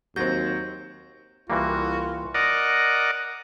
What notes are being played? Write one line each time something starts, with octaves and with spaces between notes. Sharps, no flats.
D#2 F#3 C4 G6 A#6
C2 E3 G3 A#3 F4 F#4
A#4 D5 D#5 F#5